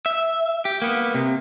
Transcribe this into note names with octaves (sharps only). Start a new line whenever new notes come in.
E5
G4
A#3 B3
C3